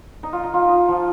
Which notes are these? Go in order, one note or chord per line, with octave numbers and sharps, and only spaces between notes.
D#4
F4
D#4
F4
D#4
F3